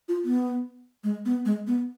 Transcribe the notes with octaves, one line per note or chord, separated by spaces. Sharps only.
F4
B3
G#3
B3
G#3
B3